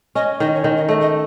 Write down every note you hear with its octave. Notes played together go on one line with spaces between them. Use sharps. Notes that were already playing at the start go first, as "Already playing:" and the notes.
C#4 D#5
D#3 D#5
C#5
D#3 D#5
D#5
A3 D#5
D#5